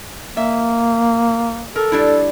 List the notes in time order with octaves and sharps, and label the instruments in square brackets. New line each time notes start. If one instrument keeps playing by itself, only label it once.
[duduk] A#3 [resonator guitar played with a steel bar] E5
[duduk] A4 [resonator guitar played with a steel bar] A#4
[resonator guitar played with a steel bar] G3 D4 E4